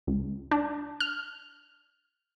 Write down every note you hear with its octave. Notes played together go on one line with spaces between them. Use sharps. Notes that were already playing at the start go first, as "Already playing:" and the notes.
C#2
D4
F6